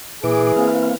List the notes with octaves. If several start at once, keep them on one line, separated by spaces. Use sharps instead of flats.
A#2 E3 G#4 D6
A#3 C4 F5